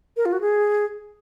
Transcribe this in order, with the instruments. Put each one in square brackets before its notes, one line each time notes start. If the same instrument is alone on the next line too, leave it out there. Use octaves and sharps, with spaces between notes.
[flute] A#4
F4
F#4
G#4